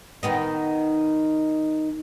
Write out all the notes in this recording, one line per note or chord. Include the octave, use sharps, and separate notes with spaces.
D#3 B3 D#4